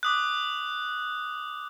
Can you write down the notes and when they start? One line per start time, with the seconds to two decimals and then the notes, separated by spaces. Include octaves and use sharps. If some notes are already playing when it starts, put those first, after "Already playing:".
0.03 D6 D#6 F#6